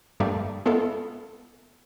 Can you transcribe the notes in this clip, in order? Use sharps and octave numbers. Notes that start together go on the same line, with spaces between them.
G2 G3 A3 A#3
G#3 B3 E4 F4 A4